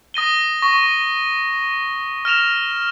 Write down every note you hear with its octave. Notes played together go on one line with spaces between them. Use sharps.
D#6 A#6 D#7 G7
C#6 A#6
F6 A#6 E7 F7